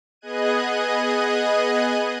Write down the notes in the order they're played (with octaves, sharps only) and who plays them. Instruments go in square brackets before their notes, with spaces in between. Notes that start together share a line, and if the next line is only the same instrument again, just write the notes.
[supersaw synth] B3 G#4 D#5 F#6 G#6 D#7